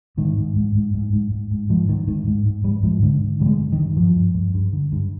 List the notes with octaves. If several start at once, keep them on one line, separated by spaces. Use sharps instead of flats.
G#2 D#3
G#2
G#2
G#2
G#2
G#2
G#2
G#2
G#2 F3
G#2 D#3
G#2 D#3
G#2
G#2
G#2 G3
G#2 F3
G#2 D3
D3
D3 G3
G#3
G2
D#3
G2
G2 F3
G2
G2
G2
D3
G2